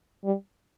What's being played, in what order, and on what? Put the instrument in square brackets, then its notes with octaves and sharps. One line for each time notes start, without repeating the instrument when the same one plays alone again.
[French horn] G3